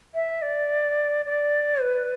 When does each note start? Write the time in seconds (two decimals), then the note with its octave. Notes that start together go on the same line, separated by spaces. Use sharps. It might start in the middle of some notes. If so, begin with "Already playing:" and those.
0.15 E5
0.42 D5
1.26 D5
1.82 B4